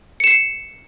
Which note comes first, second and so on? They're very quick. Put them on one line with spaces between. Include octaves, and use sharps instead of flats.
C#7 E7 C7